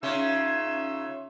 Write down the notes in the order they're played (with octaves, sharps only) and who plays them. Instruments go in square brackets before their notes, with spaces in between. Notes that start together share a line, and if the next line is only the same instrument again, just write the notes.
[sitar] C#3 [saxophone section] D#4 F4 E5